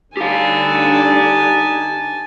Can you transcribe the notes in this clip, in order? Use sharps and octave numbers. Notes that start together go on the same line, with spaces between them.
D3 G3 D4 D#4 G4 F5 G#5 A5